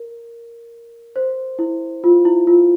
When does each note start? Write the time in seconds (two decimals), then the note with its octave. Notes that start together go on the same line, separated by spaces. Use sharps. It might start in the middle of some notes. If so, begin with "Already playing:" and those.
Already playing: A#4
1.16 C5
1.59 E4
2.04 F4
2.25 E4
2.47 F4